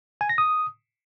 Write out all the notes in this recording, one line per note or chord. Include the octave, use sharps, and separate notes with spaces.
G#5
A#6
D#6